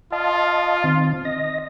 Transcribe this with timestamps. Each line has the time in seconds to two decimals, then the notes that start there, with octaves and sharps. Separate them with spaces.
0.12 F4 D#5 F5 A5
0.84 D#3 C4
1.25 D#5 A#6